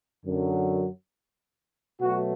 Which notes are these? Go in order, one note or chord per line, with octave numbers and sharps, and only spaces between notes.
F#2 D3 F#3
B2 F#3 A3 F#4